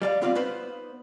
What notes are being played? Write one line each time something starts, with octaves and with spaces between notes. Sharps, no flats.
G3 D5 F5
B3 C4 F4 D5 F5
B3 D#4 B4 C5